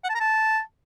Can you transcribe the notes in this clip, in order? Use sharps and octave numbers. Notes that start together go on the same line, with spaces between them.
F#5
A5
A#5
A5